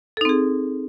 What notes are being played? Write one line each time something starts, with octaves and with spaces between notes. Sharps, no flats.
C4 D#4 G#4 A4